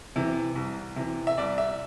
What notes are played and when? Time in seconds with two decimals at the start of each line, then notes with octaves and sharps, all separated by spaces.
0.16 C3 E3
0.56 C2
0.96 C3 E3
1.27 E5
1.38 C2 D5
1.58 E5